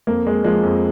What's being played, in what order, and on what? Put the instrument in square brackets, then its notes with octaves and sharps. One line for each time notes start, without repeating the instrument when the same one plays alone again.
[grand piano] F2 A#3
G#3
F3 G#3
F2